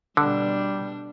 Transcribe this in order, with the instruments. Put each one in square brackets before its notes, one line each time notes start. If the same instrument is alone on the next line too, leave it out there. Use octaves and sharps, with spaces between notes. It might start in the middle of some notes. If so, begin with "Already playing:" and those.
[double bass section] B2 [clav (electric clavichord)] D3 [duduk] G3 [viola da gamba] D4